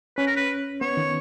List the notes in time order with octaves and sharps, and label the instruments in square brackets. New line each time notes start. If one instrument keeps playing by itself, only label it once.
[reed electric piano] C#4 [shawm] B4
[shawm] A#4
B4
[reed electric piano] B3 [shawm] C#5
[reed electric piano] D#3